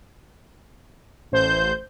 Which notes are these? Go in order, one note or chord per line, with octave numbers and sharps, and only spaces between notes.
A1 C5 G6